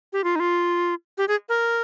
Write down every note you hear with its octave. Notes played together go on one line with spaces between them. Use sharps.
G4
F4
D#4
F4
G4
G#4
A#4